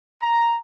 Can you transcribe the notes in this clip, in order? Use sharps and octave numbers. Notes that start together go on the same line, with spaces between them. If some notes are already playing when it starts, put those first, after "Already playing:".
A#5